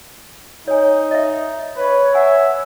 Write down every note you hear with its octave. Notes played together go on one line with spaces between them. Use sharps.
D#4 C#5 G#5
D#5 E5
B4 C#5
E5 F#5 G#5